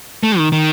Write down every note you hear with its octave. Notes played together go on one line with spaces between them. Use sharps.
A3
D#3
D#3